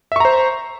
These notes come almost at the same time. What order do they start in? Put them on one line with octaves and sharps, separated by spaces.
E5 C#6 A#5 C5